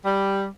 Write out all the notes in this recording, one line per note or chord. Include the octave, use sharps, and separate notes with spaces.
G3